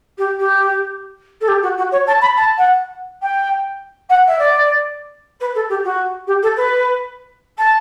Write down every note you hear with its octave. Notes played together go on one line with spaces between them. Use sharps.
G4
G4
A4
G4
F#4
F#4
C#5
A5
B5
A5
F#5
G5
F#5
E5
D5
B4
A4
G4
F#4
G4
A4
B4
A5